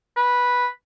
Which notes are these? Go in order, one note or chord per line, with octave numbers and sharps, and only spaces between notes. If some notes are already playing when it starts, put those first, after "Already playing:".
B4